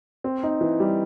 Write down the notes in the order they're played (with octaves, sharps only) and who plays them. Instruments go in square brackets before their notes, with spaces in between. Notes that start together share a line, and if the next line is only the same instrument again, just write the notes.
[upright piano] C4
D#4
E3
G3